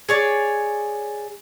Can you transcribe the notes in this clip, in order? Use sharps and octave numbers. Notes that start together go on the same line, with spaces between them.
G#4 C#5 D5